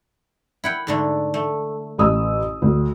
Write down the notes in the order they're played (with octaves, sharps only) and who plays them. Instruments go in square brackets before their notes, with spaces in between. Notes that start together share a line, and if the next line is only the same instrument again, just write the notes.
[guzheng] E4 F#5 G5
G#2 D3 A3
A3
[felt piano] A1 D#6 E6
D2